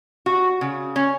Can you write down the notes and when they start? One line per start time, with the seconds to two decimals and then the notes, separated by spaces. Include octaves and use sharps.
0.26 F#4
0.61 C#3
0.96 C#4